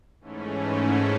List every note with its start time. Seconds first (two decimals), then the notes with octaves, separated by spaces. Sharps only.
0.20 G#2 E3 A3 C#4